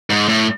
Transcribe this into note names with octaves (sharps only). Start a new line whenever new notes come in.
G#2
A2